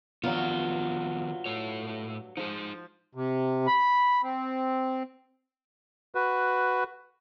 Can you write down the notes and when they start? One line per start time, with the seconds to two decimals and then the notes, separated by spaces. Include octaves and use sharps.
0.23 G2 D#3 F3 F#3 B3 F4
1.46 A2 C#5
2.37 F3 D#4 G#4
3.15 C3
3.67 B5
4.23 C4
6.15 F#4 B4